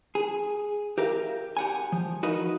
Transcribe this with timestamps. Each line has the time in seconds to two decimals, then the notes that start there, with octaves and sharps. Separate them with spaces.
0.15 G#4
0.98 G4 A#4 E5 F5
1.57 G4 F#5 G#5
1.92 F3
2.23 D#4 F#4 A#4 B4 D#5 F5